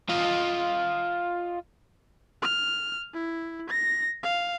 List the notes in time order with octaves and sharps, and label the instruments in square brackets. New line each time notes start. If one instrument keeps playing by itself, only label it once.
[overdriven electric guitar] F4 D#5
[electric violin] F6
E4
A#6
F5